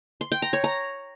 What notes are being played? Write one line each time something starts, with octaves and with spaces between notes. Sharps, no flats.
C6
G5
A#5
C#5
A#5